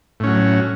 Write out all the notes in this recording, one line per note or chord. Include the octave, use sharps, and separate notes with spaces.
A2 F#3 C#4